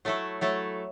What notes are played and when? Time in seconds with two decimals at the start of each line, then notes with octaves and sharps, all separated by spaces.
0.05 F#3 A3 E4 A4
0.41 F#3 A3 E4 A4